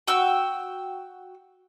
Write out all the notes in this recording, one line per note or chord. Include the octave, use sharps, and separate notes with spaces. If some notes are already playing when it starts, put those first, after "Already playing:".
F#4 G5 E6